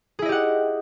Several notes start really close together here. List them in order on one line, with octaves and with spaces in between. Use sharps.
G#4 E4 D#5 G4 F#5